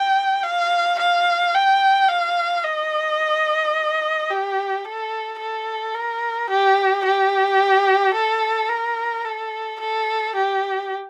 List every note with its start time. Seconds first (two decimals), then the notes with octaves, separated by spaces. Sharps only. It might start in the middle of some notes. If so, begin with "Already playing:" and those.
Already playing: G5
0.43 F5
1.00 F5
1.55 G5
2.09 F5
2.65 D#5
4.30 G4
4.85 A4
5.40 A4
5.94 A#4
6.50 G4
7.05 G4
8.15 A4
8.69 A#4
9.25 A4
9.81 A4
10.36 G4